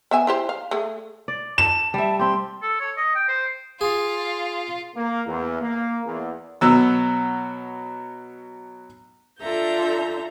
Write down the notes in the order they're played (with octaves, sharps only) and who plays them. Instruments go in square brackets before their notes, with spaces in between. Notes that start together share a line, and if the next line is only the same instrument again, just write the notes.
[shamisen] B3 E5 G#5
E4 G4 C5
F5
A3 G#4
[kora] D5
[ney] A5 [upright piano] E7
[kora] G3 E5 [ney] A5
[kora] C4 G4 [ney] C6
[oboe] A4
C#5
D#5
G5
C5
[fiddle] F4 [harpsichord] G#4
[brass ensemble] A#3
E2
A#3
E2
[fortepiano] B2 F#3 E6
[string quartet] D4 F4 A4 E5 A#5 G6